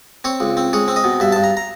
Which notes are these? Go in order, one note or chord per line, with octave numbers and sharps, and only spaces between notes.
C4 C#5
C#2
C4
G#3 C#5
C4
D#5
B2
G2 E5
G2 A5
A#5
A#5